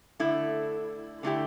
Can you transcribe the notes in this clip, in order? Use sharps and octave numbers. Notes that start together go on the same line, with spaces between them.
D3 A3 E4
D3 A3 E4 G4